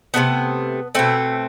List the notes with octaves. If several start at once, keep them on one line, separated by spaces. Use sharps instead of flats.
C3 F3 A3 B3
B2 A3 C4